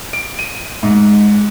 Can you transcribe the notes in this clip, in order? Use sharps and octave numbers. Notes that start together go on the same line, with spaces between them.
D7
D#7
G#2